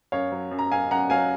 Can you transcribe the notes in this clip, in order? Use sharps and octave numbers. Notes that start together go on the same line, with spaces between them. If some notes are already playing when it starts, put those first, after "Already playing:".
F#2 C#5 F5
F#3
F#2
A#5
F#2 F5 G#5
F#2 F#5 A#5
F#3 F5 G#5